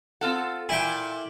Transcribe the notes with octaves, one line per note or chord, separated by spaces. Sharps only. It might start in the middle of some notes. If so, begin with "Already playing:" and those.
C4 F4 A4 F#5
A#2 E4 G5 G#5